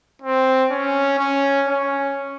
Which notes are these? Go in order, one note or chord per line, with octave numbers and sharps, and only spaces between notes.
C4
C#4
C#4
C#4